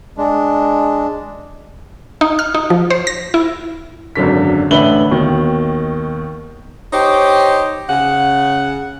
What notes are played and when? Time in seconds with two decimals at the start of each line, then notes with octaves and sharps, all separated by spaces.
0.17 G#3 D4
2.21 D#4
2.39 F6
2.54 D#4
2.70 F3
2.90 C5
3.07 A#6
3.34 E4
4.15 G#1 F#2 D3 B6
4.71 A1 D3 B4 E5 F#7 G7
5.11 D#2 B2 D#3
6.92 D#4 G4 C5 C#5
7.89 C#3 F#5